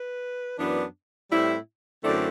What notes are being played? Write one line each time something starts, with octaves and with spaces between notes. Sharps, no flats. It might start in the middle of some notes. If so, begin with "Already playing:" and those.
Already playing: B4
F#2 E3 B3 D4
A2 G3 C4 E4
F#2 D3 A3 C4 E4 D5